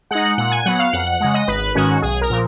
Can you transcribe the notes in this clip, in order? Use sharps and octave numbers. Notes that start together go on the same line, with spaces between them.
G#3 D#4 F#5
A#2 F#5
G#5
F#3 B3 F#5
F5
F2 F#5
F#5
C#3 G#3 F#5
D#5
G#1 B4
G#2 D#3 G#3 C#4 F#4
B1 G#4
A#4
A#2 F3